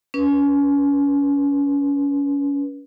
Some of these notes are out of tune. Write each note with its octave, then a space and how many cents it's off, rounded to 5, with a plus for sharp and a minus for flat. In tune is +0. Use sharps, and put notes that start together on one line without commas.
C#4 +30 B4 -30